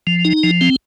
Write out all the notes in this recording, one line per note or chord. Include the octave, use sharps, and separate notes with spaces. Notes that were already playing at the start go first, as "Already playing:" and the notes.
F3
D#4
F3
C4